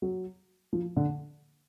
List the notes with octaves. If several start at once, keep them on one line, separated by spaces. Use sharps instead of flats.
F#3
F3
D3